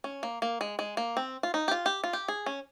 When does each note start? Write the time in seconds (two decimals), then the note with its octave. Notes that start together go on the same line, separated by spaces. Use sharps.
0.04 C#4
0.23 A#3
0.42 A#3
0.61 G#3
0.79 G#3
0.97 A#3
1.17 C4
1.43 F4
1.54 D#4
1.68 G4
1.71 F4
1.86 G4
2.04 F4
2.13 G4
2.28 G#4
2.46 C#4